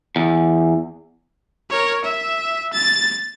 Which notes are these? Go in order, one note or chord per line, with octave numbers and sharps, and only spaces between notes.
E2
A#4 C#5
E5
A6